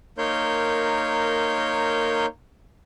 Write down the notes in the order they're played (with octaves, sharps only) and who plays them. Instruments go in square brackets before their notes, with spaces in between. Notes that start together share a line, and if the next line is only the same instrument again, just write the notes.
[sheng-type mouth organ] A#3 D#4 A#4 C#5 C6 G6